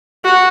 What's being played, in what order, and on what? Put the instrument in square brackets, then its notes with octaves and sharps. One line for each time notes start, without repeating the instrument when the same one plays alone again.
[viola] F#4